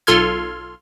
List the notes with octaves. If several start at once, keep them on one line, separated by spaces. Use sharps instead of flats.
B1 F4 A4 C6 F6 G#6